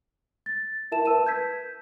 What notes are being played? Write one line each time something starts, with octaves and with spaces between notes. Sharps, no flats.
A6
E4 A#4 E5 A5 E7
B4 A5 E6 D#7 E7
G6 G#6 B6